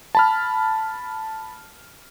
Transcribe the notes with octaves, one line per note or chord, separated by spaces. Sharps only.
A5 B5 F6